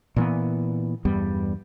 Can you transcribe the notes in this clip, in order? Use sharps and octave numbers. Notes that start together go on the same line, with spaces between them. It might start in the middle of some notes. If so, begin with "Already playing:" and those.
A#2 E3 B3
E2 G2 G3 B3